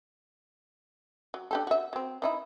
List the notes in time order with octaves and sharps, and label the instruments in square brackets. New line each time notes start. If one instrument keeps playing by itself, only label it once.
[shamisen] F#3
D4 G4 A4
F#4 E5
F#3 C4
E3 D#4 E4